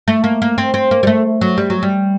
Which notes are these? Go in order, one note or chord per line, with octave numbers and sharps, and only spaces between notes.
A3
A#3
A#3
C4
C4
A#3
G3
A3
F#3
G3
F#3
G3